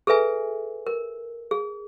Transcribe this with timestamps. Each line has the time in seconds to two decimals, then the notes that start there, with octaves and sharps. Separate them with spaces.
0.07 G#4 A4 B4 E5 G#5
0.87 A#4
1.51 G#4